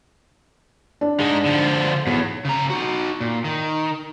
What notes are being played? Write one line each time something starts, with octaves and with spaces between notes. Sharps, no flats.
D4
G#2 G#3
D3 F3
B1 E2
C#3 A#5
D#4 F#4
A#2
D#3